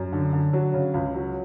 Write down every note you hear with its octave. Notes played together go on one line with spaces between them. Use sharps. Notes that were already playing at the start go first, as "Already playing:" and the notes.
Already playing: F#2
D3
D3
F#3
C#3
C#2
F#3